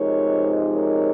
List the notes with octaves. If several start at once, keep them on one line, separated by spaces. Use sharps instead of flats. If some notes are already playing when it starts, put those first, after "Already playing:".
Already playing: C3 F3 G#3 D#4 A#4 C#5
A#4 C#5